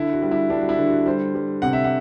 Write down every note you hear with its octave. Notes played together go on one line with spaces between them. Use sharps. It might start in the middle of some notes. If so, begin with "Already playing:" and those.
Already playing: D3 E4
F#4
G3
E4
G3 D4
F#4
E4
D3
F#4
G3 C5
G3
C3 F#5
E5
F#5